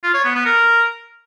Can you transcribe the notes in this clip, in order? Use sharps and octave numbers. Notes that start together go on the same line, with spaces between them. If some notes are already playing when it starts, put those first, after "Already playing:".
F4
C#5
B3
B3
A#4